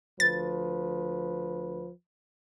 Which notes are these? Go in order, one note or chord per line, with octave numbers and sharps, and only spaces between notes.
D2 F3 B4 A6